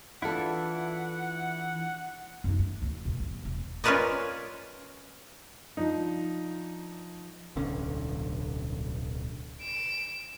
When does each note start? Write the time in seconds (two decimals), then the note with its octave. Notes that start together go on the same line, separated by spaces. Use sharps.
0.22 E3 D4 E4 F4 A4 F#5
2.44 F#2 D#4
2.59 A3
2.82 D2 A3
3.05 F2 A#2
3.20 G1 D#3
3.45 E1
3.84 C#4 F4 A#4 B4 D5 D#5
5.77 F3 D4 D#4
7.56 D1 B1 D3 C#4
9.61 D7 E7